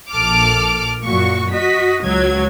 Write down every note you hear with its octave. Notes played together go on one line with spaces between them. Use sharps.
A#1 A4 D6 F6
F#2 A#2 F#4 C#6
F#4 D#5 B6
C#2 F#3 G#6